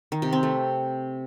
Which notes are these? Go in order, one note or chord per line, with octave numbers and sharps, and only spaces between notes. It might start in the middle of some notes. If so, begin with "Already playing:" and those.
D#3
C3
C4
A3